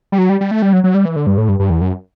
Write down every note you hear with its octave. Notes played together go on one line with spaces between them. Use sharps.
G3
F#3
G3
G3
A3
G3
F#3
F#3
G3
E3
D3
G2
A2
G2
G2
E2
F#2